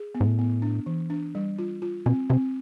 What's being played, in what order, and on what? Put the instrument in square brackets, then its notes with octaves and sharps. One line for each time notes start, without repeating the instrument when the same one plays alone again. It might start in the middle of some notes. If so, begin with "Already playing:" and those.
Already playing: [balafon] G#4
B3
[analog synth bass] G#2
A2
[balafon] B3
D4
E3
D4
G3
F4
F4
[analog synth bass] B2 [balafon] C4
[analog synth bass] C3 [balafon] C4